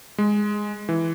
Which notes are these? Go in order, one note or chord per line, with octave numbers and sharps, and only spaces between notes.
G#3
E3